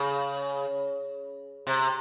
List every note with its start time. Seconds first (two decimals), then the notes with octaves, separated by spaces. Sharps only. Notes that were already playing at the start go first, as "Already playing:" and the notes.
Already playing: C#3
1.67 C3